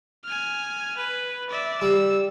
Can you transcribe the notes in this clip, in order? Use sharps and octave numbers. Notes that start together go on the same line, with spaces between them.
G#5 F6
B4
D5 E5
G3 E6